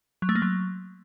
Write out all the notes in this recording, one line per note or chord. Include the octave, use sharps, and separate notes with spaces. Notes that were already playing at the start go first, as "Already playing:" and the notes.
F#3
A3
A#3
F#3